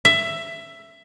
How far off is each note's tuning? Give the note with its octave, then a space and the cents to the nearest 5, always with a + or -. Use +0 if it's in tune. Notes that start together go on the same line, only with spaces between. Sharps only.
E5 +15